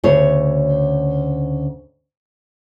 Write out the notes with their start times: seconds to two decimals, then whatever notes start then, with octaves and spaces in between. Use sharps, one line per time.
0.04 D2 C#3 C#5